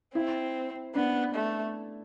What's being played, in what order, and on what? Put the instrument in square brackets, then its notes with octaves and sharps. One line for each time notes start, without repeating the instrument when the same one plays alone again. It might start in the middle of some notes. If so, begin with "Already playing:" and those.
[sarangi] C4 [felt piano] E4
[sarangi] B3 [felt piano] D4
[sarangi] A3